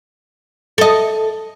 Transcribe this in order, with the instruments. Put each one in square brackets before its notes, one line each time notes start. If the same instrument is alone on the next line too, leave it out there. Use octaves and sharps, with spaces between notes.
[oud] A4 D#5